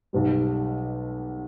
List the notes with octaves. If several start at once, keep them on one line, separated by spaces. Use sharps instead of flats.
B1 B2 G3